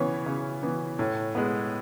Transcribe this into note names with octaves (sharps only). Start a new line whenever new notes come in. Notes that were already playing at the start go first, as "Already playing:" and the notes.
Already playing: C#3 E3 B3 C#4 C#5
C#3
E3 B3
A2
G#3 B3